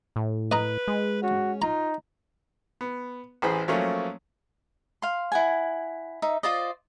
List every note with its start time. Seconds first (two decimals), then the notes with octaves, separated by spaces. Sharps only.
0.16 A2
0.52 B4 D#5 A#5
0.88 G#3
1.22 C#4 F#4
1.62 D#4 F4 A#5
2.81 B3
3.42 A1 E3 G#4 C5 B5
3.68 F3 F#3 A3 A#3 C#4
5.02 F5 C6
5.32 E4 F#5 G#5
6.22 D#4 E5
6.43 F4 C5 D5 D#5